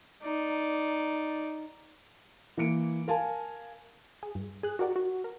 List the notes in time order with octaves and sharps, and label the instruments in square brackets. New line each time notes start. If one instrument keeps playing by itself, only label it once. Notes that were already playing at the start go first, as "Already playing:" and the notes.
[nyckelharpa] D#4 D5
[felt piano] E3 A#3 C#7 D7
A#4 F5 G#5 A5
[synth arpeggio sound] G#4
G2
G#4 F#6
F#4 G4 A#4 D5 F#5
F#4
A#4